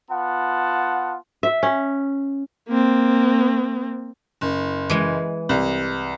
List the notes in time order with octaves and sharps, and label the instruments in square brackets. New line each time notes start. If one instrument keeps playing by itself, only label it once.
[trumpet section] B3 F4 F#5 A5
[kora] E5
C#4
[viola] A#3 C4
[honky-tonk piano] F#1
[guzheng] E3 G#3
[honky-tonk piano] C2